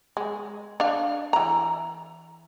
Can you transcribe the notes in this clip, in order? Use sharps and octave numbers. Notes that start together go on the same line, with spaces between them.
G#3
D4 F5
E3 A#5